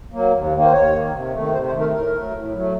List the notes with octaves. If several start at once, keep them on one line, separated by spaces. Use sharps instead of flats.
F#3 A#3
D#2
D#3 A#3
C5
D#2 C#5
D#3 A#3
C3
D#3 A3
C3 C5
C5
D#3 A3
A#4
A2 A#4
F#3 A3
A2
F#3 A3